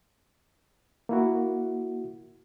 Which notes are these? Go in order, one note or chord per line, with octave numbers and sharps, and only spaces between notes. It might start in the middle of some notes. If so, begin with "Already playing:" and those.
A#3 E4 F#4